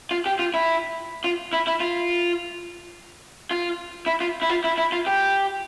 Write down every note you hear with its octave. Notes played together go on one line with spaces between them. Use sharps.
F4
G4
F4
E4
F4
E4
E4
F4
F4
E4
F4
E4
F4
E4
E4
F4
G4